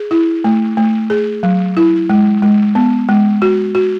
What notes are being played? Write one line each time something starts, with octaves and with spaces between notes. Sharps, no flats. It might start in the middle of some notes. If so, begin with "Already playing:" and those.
Already playing: G#4
E4
A3
A3
G#4
F#3
E4
G#3
G#3
B3
G#3
F#4
F#4